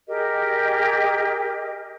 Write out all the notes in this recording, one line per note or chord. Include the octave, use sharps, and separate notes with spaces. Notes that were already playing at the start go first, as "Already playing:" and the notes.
G4 G#4 A#4 D#5